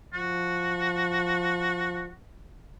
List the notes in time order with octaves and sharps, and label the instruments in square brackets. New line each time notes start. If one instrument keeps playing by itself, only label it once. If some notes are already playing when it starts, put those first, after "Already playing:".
[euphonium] F3 [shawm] F#4